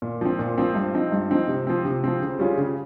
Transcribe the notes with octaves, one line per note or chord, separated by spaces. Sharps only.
A#2
F3 C4
A#2
F3 C4
G2
F3 C4 D#4
G2
F3 C4 D#4
C3
F3 C4
C3
F3 C4
C#3
G3 C#4 F4 G#4
C#3